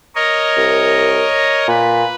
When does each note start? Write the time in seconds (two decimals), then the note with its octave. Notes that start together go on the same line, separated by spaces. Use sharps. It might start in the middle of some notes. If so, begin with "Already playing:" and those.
0.15 A#4 C#5 D#5
0.57 C2
1.68 A#2 B4